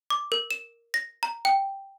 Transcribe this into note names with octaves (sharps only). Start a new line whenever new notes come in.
D6
A#4
E7
A#6
A#5
G5